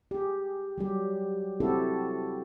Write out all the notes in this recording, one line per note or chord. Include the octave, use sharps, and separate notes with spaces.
G4 G#4
F#3 G3 G4
C4 E4 F#4 G4 A4